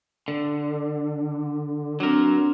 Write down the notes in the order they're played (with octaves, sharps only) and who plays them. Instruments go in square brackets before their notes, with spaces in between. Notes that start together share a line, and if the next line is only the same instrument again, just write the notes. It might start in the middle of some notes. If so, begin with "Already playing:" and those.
[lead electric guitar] D3
[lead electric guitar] F#3 A#4 [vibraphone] C4 D4